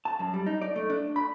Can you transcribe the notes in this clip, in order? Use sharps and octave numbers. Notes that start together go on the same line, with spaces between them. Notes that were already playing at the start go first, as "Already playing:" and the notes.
A5
F#2
G3
D#4
D5
A3
D4
B5